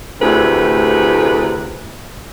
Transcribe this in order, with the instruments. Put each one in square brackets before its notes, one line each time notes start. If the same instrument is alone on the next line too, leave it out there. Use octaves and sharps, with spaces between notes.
[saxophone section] D2 A2 C3 G#4 B4